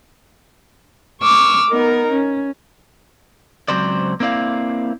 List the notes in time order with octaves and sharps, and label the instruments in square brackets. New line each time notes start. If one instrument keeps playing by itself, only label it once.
[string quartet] C#6 D6 E6 F6
B3 D#4 A#4
C#4
[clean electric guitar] C#2 G2 F#3 C4 C5 D5
A#3 C4 E4 D5 F5